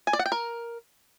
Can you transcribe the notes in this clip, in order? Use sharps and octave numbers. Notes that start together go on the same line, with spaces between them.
G#5
D5
F#5
G5
A#4